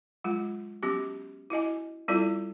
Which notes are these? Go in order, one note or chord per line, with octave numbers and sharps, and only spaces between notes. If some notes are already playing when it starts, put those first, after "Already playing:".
F#3 G#3 F4
F#3 B3 C#4 F#4 G4
E4 F#4 D#5 G#5
G3 C4 E4 F4 A4 D5